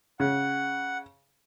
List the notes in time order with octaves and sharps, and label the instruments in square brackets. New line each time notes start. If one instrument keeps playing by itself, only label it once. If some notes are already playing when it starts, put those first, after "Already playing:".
[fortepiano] C#3 [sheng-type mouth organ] F#5